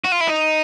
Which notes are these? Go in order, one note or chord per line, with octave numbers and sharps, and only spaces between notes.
F#4
F4
E4
D#4